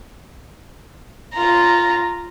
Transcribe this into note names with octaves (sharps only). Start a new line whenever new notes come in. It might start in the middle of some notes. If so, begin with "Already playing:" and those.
F4 A#5